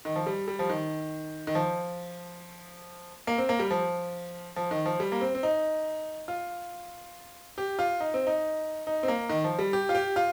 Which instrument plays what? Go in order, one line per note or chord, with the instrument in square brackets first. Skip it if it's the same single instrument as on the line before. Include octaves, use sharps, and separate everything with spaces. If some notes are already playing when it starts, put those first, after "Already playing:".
[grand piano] D#3
F3
G3
G3
F3
D#3
D#3
F3
A#3
C4
A#3
G3
F3
F3
D#3
F3
G3
A#3
C4
C4
D#4
F4
G4
F4
D#4
C4
D#4
D#4
C4
A#3
D#3
F3
G3
G4
F4
G4
F4